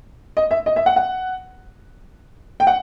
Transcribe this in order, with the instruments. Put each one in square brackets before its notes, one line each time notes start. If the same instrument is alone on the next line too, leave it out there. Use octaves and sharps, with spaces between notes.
[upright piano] D#5
E5
D#5
E5
F#5
F#5
G5
F#5